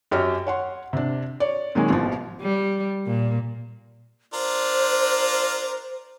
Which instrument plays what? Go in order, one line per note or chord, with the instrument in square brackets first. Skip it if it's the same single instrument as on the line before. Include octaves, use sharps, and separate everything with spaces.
[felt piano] F#2 G4 C#5 D#5 F6
C#5 F#5 C6
C3 D4
C#5 D5
A#2 D#3 F#3 G#3
A1 B2 F3
[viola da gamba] G3
A#2
[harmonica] D4 F4 A#4 [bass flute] C5